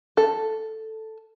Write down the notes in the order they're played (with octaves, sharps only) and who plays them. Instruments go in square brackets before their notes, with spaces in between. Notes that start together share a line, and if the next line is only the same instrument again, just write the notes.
[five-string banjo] A4